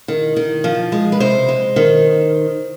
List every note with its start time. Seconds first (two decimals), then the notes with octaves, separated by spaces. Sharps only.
0.08 D#3
0.36 D#3
0.64 F3
0.92 G#3
1.12 B4
1.20 C3 C5
1.48 G#3
1.76 D#3